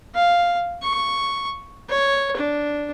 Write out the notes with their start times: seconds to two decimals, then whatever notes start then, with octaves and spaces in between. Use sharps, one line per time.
0.15 F5
0.83 C#6
1.89 C#5
2.36 D4